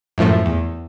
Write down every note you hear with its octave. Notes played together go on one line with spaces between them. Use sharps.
F#2 A2 F3 A3
E2